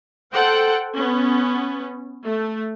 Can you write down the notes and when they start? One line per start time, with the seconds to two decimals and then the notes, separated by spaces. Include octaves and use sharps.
0.33 A4 C5 F#5 G5
0.96 B3 C#4
2.25 A3